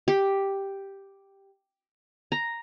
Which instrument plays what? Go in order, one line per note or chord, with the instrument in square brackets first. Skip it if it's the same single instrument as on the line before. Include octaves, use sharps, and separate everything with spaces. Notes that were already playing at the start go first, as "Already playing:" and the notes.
[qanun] G4
A#5